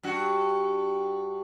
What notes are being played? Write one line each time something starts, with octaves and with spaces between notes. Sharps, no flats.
G2 F#4